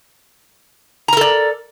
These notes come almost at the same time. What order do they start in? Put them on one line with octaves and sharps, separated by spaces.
A#5 A#4 A4 D5